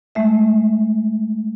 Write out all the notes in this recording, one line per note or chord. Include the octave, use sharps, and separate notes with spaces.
G#3 A3 E5